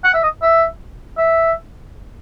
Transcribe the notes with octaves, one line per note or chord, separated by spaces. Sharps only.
F#5
E5
D#5
E5
E5